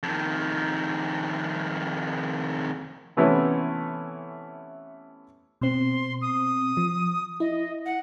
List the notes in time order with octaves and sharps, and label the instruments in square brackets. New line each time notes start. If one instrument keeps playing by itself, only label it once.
[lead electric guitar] F2 D#3
[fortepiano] C3 E3 A3 B3 C#4 E4
[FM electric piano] B2 C4 [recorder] C6
[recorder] D#6
[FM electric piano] F3
[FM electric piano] E4 [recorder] D#5
[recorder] F#5